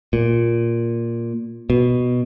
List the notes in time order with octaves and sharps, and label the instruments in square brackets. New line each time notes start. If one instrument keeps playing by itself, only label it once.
[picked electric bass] A#2
B2